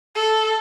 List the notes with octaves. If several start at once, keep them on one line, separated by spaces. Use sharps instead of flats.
A4